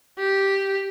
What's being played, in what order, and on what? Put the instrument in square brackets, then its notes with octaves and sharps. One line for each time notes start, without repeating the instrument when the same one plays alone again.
[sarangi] G4